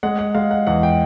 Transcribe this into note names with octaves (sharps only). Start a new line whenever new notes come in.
G#3 F#5
F#5
G#3 F5
F#5
E2 F#5
G5